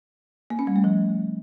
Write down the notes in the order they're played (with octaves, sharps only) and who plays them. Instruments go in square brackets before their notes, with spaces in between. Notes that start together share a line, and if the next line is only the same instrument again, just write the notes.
[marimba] A#3
C#4
G3
A3
F3